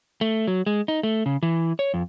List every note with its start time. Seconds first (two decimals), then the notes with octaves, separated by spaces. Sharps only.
0.21 A3
0.47 F#3
0.66 G#3
0.88 D#4
1.03 A3
1.26 C#3
1.43 E3
1.79 C#5
1.94 F2